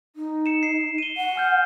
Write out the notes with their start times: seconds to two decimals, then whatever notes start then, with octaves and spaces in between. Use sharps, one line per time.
0.16 D#4
0.46 C#7 E7
0.63 C7
0.98 D#7 G7
1.17 F#5
1.36 G#5 F6 G6